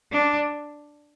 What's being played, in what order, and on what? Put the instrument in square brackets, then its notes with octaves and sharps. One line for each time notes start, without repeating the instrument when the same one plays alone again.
[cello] D4